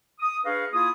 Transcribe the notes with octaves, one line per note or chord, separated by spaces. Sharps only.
D#6
D4 G#4 B4 C#5 D#5 F5
A#3 E4 F4 G#4 D#6